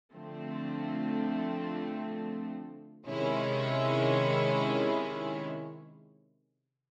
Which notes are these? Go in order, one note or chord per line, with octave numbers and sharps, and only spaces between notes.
D3 F3 A3 C4
C3 D#3 G#3 C#4 E4